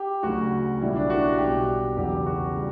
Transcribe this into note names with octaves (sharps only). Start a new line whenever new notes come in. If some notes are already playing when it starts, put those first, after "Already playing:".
Already playing: G4
D2 C#3 F#3 F#4
B1 A#2 G3 E4
D4
F#4
B1 B2 G3 G4
E2 C#3 F#3 G4
F#4
C#3 G3